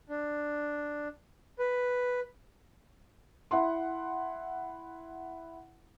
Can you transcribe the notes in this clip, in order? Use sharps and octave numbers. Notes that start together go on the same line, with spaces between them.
D4
B4
E4 F#5 C6